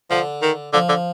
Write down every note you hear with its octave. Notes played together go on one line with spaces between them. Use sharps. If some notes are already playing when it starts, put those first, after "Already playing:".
D3 F3
D#3
D3 F3
D3